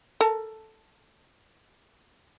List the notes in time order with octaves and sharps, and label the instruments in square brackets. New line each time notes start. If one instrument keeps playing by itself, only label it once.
[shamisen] A4 A#4 A5